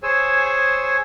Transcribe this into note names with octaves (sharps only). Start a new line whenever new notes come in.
G#4 C5 C#5 G#5 E6